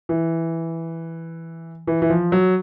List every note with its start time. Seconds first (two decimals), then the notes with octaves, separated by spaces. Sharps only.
0.09 E3
1.87 E3
2.02 E3
2.10 F3
2.32 F#3